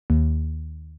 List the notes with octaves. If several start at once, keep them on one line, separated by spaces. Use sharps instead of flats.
D#2